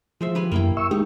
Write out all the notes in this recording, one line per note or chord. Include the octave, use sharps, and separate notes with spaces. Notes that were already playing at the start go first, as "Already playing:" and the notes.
F3 G#3 C5 E5
G4 B4 G#5
F#2 A#3 E4 G5
E5 C#6 E6
G#3 D#4 G4